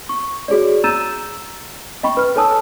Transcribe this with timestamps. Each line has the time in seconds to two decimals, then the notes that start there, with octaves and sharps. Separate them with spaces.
0.09 C#6
0.48 F#4 G#4 C#5 D5
0.84 A#5 E6 G6 A6 D#7 E7
2.03 D#5 G5 B5 C#6
2.17 B4 F6
2.36 A4 C#5 G#5 A5 D#6 E6